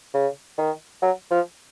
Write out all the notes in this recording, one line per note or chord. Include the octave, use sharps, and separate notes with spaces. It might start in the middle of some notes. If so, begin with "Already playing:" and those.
C#3
D#3
F#3
F3